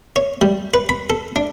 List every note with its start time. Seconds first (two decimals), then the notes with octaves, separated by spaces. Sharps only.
0.16 C#5
0.41 G3
0.74 B4
0.89 B5
1.10 A4
1.36 D4